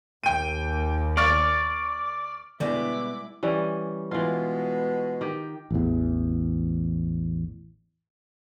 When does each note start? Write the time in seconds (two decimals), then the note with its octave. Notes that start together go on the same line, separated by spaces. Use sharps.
0.24 D#2 G5 D#7
1.17 D5 C#6 F6 A6
2.60 B2 D3 G3 G#3 B3 E4 D5 D6
3.43 E3 G3 C#4
4.11 B2 E3 G#3 F4
5.21 D#3 G4
5.71 A1 E2